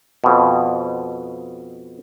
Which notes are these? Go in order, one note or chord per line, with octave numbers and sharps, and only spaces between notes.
F2 B2